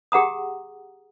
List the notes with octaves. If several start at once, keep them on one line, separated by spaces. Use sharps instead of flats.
G4 G#4 F#5 A#5 D#6